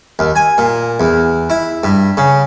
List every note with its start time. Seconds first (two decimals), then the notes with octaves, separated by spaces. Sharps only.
0.19 D#2
0.36 G#5
0.58 A#2
1.00 E2
1.50 E4
1.84 G2
2.17 C#3